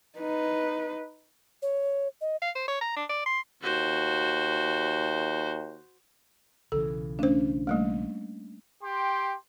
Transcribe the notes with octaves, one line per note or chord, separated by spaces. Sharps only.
D#4 B4
C#5
D#5
F5
C5
C#5
A#5
D4
D5
C6
D#2 F#4 C5
B1 C#3 E3 A4
A3 C#4 D4 C5
G3 A3 A#3
G4 G5 C6